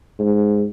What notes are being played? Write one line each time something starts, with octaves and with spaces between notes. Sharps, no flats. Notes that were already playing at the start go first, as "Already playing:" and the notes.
G#2